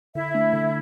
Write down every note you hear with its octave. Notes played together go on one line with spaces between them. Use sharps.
D3 E4 E5
A3 D4
D3